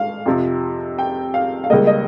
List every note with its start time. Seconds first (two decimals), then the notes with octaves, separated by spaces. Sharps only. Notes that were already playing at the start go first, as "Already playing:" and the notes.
Already playing: G#2 F5
0.26 F2 C3 F3
0.98 G5
1.34 F5
1.64 F5
1.70 C#2 C#3 G3 A#3 D#5
1.87 D#5